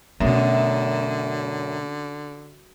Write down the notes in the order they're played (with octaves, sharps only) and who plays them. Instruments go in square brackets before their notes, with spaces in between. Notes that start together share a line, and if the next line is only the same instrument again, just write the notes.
[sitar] F#2 [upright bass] B2 A3 [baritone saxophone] D3